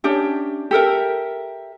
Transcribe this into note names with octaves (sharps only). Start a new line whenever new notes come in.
C#4 D4 G4 E5
G4 A4 A#4 E5